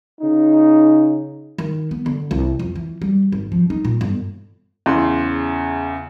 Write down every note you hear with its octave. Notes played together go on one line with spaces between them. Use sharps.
C#3 D#4
D#3
B3
D3
C2
F2
E3
G3
G#1
F3
D#4
A#2
G1
E2 C#3 C6